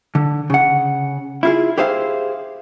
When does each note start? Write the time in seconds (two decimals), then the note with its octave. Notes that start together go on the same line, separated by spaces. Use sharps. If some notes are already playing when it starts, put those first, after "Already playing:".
0.15 D3
0.50 C#3 F#5
1.43 E4 F4 G#4
1.78 G4 G#4 C5 E5 F5